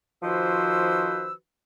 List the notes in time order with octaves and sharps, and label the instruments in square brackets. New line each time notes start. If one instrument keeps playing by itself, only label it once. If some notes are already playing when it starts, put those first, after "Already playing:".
[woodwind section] D#3 F3 F#4 B4 C5 E6